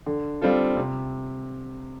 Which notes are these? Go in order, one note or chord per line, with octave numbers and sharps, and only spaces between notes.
D3
G3 C4 F4 A4
C3